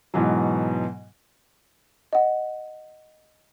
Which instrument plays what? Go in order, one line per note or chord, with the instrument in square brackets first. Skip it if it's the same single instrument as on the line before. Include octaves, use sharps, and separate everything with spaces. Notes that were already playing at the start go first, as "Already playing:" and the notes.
[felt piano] G#2 B2 E3 F#3
[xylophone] D#5 F#5